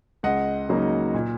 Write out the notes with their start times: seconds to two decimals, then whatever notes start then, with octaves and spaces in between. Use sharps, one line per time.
0.23 C#2 D#5 F#5
0.69 C#3 F#3 A#3 D#4
1.14 A#2